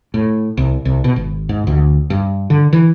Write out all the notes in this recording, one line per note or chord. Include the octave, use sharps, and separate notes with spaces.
A2
C2
C2
B2
G#1
G#2
D2
G2
D3
E3